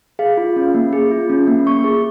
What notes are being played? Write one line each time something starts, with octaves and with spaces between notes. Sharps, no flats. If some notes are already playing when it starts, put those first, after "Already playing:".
G#4 F5
F4
C#4
A#3
G#4
F4
C#4
A#3
A#3 C#6
G#4